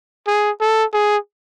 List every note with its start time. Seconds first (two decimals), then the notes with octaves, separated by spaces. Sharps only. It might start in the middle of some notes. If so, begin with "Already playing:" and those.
0.27 G#4
0.61 A4
0.94 G#4